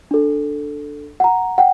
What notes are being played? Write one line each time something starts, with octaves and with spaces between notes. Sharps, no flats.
D4 A4
F#5 A#5
F#5 G5